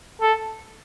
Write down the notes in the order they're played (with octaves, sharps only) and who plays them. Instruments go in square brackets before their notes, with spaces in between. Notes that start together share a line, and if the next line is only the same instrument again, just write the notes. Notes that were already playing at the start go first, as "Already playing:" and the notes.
[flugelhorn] A4